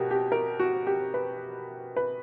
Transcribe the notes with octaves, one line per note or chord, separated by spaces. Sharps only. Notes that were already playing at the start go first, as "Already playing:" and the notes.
Already playing: B2 F#4 G4 A#4
G4
A#4
F#4
G4
B4
B4